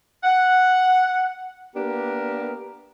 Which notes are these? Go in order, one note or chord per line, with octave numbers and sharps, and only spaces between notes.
F#5
A#3 B3 D4 G4 A#4